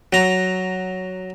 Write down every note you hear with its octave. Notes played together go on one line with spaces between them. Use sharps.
F#3 A#5